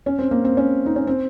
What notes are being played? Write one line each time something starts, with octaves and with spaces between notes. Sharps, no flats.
C#4
C4
A#3
C4
C#4
D#4
C#4
C4